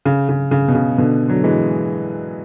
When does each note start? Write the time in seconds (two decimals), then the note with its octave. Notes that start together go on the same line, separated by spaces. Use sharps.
0.05 C#3
0.29 C#3
0.51 C#3
0.68 B2
0.75 C#3
0.98 B2 D3
1.28 D3 F#3
1.44 E3 G#3